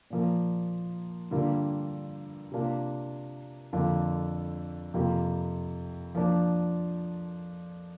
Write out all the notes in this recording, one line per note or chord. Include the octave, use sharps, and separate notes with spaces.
A#2 F3 A#3
G2 D3 G3 A#3 F4
C3 A#3 D4 F4
F2 D3 A#3 D4 F4
F2 C3 A#3 F4
F3 A#3 D4